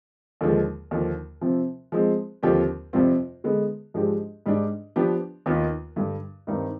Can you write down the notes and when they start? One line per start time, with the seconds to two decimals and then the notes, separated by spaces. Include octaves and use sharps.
0.41 D#2 D3 F3 G#3
0.91 D#2 D3 F3
1.41 C3 F3 C4
1.92 F3 G#3 C4
2.43 D#2 D3 F3 C4 G4
2.93 F2 C3 G3 C4 F4
3.44 D3 G#3 B3
3.94 G#2 F3 G#3 D4 G4
4.46 G#2 G3 D4
4.96 F3 B3 D4 G4
5.46 D#2 D#3 B3 F4 B4
5.96 G2 D3 G3
6.47 G2 D#3 G3 C4 D#4